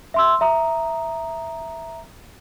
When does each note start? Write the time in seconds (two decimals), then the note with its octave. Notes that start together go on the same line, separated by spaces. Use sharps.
0.14 E5 C6 E6
0.41 E5 A#5 D#6